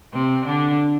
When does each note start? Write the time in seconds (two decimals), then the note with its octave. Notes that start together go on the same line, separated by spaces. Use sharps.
0.13 C3 C4
0.45 D3 D4